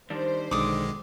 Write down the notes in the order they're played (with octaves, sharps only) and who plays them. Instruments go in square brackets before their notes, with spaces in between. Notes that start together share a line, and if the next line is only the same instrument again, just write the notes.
[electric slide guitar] D#3 G3 D4 [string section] C5
[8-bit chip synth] B1 D#3 G#3 [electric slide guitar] D3 [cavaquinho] D6 D#6